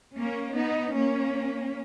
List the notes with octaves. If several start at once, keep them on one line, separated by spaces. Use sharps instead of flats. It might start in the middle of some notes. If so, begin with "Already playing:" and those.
A#3 C#4
B3 D#4
A#3 C#4